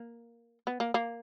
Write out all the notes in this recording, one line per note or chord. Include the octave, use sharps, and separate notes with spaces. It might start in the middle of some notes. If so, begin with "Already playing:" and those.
Already playing: A#3
B3
A#3
A#3